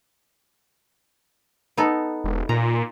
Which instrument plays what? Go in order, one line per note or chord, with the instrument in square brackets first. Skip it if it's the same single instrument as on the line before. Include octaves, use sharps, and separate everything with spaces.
[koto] B3 D#4 A4
[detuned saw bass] E1
[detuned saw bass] A#2 [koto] A#5